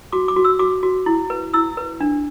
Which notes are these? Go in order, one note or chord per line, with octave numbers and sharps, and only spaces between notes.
F#4 D6
D6
F#4
E6
F#4 D6
F#4
E4
B4
E4 E6
B4
D4